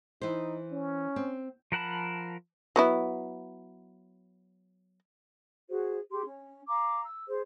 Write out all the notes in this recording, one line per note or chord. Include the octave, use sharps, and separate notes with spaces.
E3 D#4 C5
C#4
C4
F3 A#4 F#5 A5 B5
F#3 B3 E4
F#4 G#4 C5
G4 G#4 C6
C#4
F5 A#5 D6
E6
G#4 C5